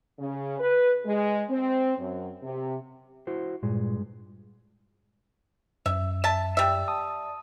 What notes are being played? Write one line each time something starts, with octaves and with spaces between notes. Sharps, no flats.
C#3
B4
G#3
C4
F#2
C3
E4 F#4 C5
G2 A#2 G#3
F#2 E5
E5 A5
G3 E5
A5 D#6